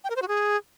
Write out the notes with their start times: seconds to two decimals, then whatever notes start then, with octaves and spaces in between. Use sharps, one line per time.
0.04 G5
0.10 A#4
0.16 C5
0.22 F#4
0.28 G#4